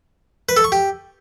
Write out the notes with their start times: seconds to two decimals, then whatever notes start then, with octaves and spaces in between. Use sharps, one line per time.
0.49 B4
0.56 A4
0.64 C#6
0.72 G4